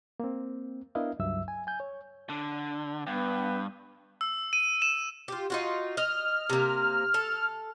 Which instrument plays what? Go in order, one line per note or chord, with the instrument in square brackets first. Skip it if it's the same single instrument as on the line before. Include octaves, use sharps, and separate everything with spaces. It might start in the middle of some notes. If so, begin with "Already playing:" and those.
[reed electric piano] A#3 C4
B3 D4 E4 A#4 D#5 F5
C#2 G2 F#3 E5 E6
G#5
G#5 G6
C#5
[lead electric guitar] D3
[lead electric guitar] G2 [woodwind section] B3 B4
[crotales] E6
D#7
E7
[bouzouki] F4 G4
D#4 F4 F#4
[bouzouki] D#5 [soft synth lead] F6
[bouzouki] C3 A#3
A4